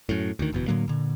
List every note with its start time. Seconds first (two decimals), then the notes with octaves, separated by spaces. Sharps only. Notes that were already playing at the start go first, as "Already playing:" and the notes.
0.09 F#2 A2
0.39 D2 D#3
0.53 F#1 E2 B2
0.68 A2 D3 F#3 A#3
0.88 A#2 D3